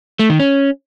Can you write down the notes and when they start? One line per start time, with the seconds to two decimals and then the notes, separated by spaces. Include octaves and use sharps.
0.19 A3
0.30 D#3
0.40 C#4